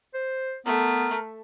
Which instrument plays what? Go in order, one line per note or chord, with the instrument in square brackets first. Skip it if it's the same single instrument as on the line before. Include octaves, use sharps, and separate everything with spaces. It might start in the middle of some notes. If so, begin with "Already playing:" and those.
[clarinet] C5
[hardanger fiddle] A3 [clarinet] B3 [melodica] A#4